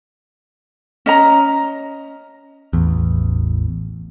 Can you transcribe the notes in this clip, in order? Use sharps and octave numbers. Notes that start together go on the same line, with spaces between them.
C#4 D#5 A#5
A1 E2